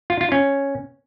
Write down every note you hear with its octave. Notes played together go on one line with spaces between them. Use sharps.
F4
F4
C#4